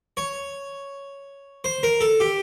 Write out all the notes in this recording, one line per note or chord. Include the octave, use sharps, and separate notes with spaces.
C#5
C5
A#4
A4
G4